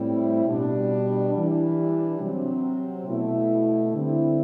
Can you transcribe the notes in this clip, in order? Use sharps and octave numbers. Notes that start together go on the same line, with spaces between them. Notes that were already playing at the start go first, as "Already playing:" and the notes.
Already playing: A2 G3 C4 E4
B2 G3 D4
E3 G3 D4
C3 F#3 C4
B2 A3 E4
D3 G3 C4 E4